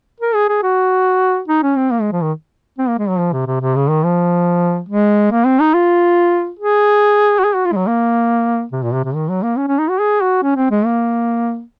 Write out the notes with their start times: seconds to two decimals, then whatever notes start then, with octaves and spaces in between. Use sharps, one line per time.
0.20 A#4
0.34 G#4
0.49 G#4
0.63 F#4
1.48 D#4
1.63 C#4
1.77 C4
1.91 A#3
2.01 G#3
2.12 F3
2.23 D#3
2.78 C4
2.88 A#3
2.98 G#3
3.09 F#3
3.19 F3
3.33 C3
3.47 C3
3.61 C3
3.75 C#3
3.89 D#3
4.04 F3
4.89 G#3
5.32 A#3
5.46 C4
5.60 D#4
5.74 F4
6.59 G#4
7.39 F#4
7.44 G#4
7.55 F#4
7.66 F4
7.72 G#3
7.76 F#3
7.87 A#3
8.72 C3
8.83 A#2
8.93 C3
9.04 C3
9.15 D#3
9.29 F#3
9.43 A#3
9.57 C#4
9.68 C#4
9.79 D#4
9.89 F#4
10.00 G#4
10.21 F#4
10.43 C#4
10.56 C4
10.71 G#3
10.85 A#3